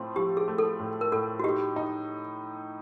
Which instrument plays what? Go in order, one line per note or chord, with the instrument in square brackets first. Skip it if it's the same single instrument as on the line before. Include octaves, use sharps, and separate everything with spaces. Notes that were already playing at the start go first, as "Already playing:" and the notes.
Already playing: [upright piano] A2 F3 A3 C4
[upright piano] F3 [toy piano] G4
[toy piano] G#4
[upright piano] A3
[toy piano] A4
[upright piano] A2
[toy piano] A#4
[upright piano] A2 [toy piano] A4
[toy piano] F#4
[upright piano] D#4 [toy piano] G4
[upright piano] D#4